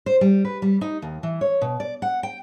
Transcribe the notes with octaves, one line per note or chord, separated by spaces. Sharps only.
C5
G3
B4
G3
D#4
D#2
E3
C#5
B2
D5
F#5
G5